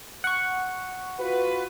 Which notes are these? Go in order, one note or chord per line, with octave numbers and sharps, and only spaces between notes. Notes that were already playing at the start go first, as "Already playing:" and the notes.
F#5 C#6
F4 F#4 B4